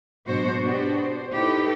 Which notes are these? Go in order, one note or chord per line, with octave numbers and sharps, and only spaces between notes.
G#2 B2 F#3 D4 F#4 C5
B3 D4 F#4 G4
C5
D#4 E4 G4 A4 B4